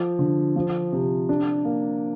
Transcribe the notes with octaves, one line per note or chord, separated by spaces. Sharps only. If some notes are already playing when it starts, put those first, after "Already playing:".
Already playing: F3
D3
F3
C3
D4
A#3